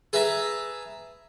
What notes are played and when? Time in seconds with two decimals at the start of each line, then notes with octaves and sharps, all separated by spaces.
0.13 G#4 B4 E5 A5 A#5